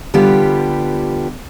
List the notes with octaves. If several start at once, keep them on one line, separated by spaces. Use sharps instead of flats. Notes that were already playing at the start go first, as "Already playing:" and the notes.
D3 G3 B3 F4 G4